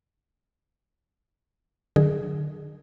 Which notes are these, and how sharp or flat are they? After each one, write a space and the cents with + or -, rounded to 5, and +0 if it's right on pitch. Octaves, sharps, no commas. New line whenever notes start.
D3 +35 F#3 +0 G#4 +0